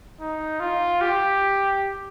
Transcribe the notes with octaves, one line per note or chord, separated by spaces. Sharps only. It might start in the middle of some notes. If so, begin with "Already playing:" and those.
D#4
F4
G4